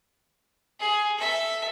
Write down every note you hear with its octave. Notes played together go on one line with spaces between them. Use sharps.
G#4
A4 E5